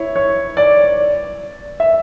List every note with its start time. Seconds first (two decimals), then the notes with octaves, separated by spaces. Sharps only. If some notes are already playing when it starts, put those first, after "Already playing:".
Already playing: E4 C#5
0.16 C#5
0.57 D5
1.80 E5